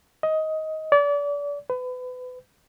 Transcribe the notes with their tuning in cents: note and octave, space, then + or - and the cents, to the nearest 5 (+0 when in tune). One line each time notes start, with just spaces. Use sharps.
D#5 +15
D5 -35
B4 +30